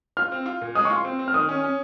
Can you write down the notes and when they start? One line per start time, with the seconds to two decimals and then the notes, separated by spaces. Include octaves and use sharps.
0.17 F4 F6
0.32 C4
0.46 F4
0.61 A#2
0.75 G#3 D#6
0.85 F4 C#6
0.96 C6
1.05 C4
1.19 C4
1.28 F6
1.34 D#3 D#6
1.49 C#4
1.64 C#4